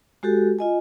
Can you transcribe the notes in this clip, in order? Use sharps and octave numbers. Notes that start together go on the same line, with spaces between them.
G#3 F#4 G4 A4
F4 D#5 G#5